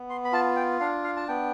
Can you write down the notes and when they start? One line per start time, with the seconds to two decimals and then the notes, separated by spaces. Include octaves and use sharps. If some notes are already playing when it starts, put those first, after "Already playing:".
Already playing: B3
0.10 C6
0.25 B5
0.33 F4 A5
0.56 G5
0.80 D4 F5
1.04 F5
1.17 A5
1.28 B3 G5